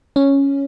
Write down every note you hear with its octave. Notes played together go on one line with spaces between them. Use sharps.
C#4